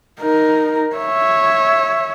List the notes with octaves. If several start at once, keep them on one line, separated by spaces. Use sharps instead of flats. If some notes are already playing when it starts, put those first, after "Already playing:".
D#4 A#4
C#5 E5